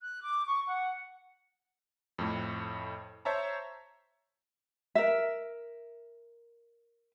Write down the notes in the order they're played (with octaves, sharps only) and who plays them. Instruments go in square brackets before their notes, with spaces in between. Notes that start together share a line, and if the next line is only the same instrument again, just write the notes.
[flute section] F#6
D6
C#6
F#5
[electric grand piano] F2 A2
C5 C#5 E5 A5 A#5
[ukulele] A#4 E5